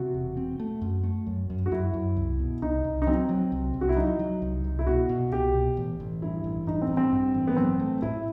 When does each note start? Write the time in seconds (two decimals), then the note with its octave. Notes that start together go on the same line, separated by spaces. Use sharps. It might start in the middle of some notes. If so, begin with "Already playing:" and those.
Already playing: C3 F#4
0.14 E1
0.37 C4
0.60 A3
0.81 F#2
1.03 A3
1.27 F#2
1.50 F#2
1.66 F#4
1.72 F#2 E4
1.94 F#2
2.17 C2
2.40 B2
2.62 C2 D#4
2.84 C2
3.02 D#4
3.07 F#3 C4
3.29 F#3
3.52 C2
3.74 C2
3.81 F#4
3.89 E4
3.96 F#3 D#4
4.19 F#3
4.42 C2
4.64 C2
4.79 E4
4.87 B2 F#4
5.09 B2
5.32 C2 G4
5.54 B2
5.77 A1
6.00 A1
6.22 G2 E4
6.44 A1
6.67 G2 D#4
6.82 C4
6.89 G2
6.97 C4
7.12 G2
7.34 A1
7.47 B3
7.57 F#3 C4
7.80 A3
8.02 A2 E4